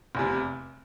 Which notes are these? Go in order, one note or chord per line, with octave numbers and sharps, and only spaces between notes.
F1 E2 C3